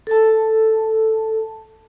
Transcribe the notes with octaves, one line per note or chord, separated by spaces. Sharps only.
A4 A5